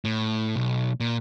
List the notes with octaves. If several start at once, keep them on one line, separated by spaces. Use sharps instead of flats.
A2
B1
A#2